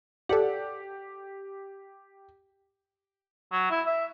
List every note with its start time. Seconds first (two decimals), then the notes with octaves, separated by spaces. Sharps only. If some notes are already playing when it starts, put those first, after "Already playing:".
0.29 G4 A4 D5 F#5
3.52 F#3
3.71 E4
3.86 E5